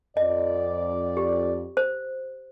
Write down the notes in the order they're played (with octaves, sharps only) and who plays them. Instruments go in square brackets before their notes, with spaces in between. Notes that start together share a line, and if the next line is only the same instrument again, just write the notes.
[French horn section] F2 D5 [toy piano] D#5
[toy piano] G4
C5